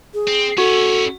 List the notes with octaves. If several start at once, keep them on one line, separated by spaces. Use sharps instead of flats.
G#4
C4
C#4 E4 F#4 A4